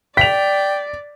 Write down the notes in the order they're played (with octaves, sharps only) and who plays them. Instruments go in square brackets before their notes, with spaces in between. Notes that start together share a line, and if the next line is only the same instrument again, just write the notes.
[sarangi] D5 [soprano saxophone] G5 [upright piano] B6 F7